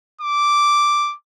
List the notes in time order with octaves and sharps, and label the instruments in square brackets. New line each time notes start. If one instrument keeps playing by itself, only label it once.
[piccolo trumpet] D6